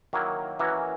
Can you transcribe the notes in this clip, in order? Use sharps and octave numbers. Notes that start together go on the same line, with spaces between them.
D#3 F#3 A#3 E4 A#4
E3 A#3 C#4 F#4 A#4